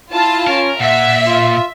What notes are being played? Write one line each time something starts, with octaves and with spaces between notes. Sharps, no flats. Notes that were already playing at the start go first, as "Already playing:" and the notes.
E4 F4 A5
C#4 A#4
A#2 E5 F#5
F4